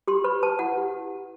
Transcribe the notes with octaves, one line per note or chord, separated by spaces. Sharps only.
G4 C6
B4 B5
B4 A5
E4 F#5
G4